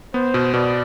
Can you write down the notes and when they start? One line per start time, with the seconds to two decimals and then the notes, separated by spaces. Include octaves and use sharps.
0.14 B3 C5
0.34 B2
0.54 B2 D5